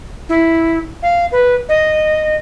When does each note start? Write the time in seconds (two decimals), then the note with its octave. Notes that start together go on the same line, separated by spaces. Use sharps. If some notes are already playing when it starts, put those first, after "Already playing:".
0.29 E4
1.02 F5
1.32 B4
1.69 D#5